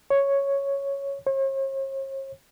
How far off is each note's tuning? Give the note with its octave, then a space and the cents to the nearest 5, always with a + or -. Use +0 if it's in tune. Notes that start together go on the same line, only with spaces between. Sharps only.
C#5 +0
C#5 -45